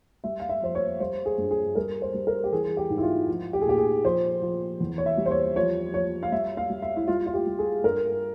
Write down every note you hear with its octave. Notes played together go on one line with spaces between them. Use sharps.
G3 E5
F5
E5
F2 C5
C#5
G3 C5
G#4
G2
G#4
G3 A#4
C5
G3
A#4
G4
E3 G#4
G4
G#2
E4
F4
F3
G4
G#4
A#2 G4
G#4
F3 C5
F3
E2
C#5
E5
G3
C5
C#5
F3 C#5
F3 C#5
F5
G3 E5
F5
G3
E5
E4
G3 F4
F4
G4
G3
G#4
G2 A#4